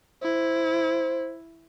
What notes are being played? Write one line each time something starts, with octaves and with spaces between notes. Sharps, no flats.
E4 C5